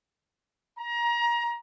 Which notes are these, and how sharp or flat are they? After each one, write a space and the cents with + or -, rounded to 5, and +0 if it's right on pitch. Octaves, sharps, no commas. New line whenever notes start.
A#5 +25